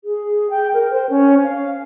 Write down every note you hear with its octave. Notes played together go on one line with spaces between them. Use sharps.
G#4
G5
A#4
C5
C#4
F5